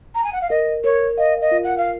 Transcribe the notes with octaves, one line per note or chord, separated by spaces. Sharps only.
A#5
G#5
F#5
F5
A#4 D#5
A#4 C#5
D#5 F5
D#5
F4
F#5
F5